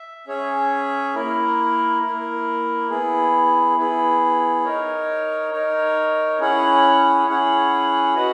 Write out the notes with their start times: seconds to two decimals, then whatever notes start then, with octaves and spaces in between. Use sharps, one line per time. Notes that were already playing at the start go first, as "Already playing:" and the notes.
Already playing: E5
0.27 C#4 G#4 C#5 E5
1.15 A#3 E4 A#4
2.02 A#3 E4 A#4
2.90 B3 E4 G#4
3.77 B3 E4 G#4
4.64 D#4 A#4 C#5
5.52 D#4 A#4 C#5
6.40 C#4 E4 G#4 C#5 F#5
7.27 C#4 E4 G#4 C#5 F#5
8.14 F#4 B4 D#5 F#5